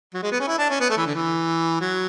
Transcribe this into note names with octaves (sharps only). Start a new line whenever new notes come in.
F#3
G#3
B3
C#4
E4
D4
C#4
B3
A3
E3
D3
E3
F#3